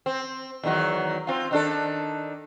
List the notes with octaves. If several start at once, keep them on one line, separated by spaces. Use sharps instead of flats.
C4
E2 D#3 F#3
C4 F4
D#3 D4 A4